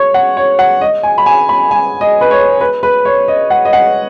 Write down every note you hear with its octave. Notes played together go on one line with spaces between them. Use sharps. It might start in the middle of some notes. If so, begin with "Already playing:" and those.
Already playing: C#5
F#5
C#5
F#5
D#5
G#5
B5
G#5
B5
G#5
D#5
B4
C#5
B4
B4
C#5
D#5
F#5
D#5
F#5